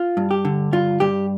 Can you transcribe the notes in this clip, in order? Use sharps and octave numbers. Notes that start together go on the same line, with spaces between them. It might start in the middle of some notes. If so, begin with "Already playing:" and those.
Already playing: F4
G2
G4
D3
G2 F4
G2 G4